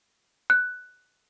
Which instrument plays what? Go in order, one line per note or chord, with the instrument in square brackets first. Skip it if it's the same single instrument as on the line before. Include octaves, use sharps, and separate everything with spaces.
[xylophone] F#6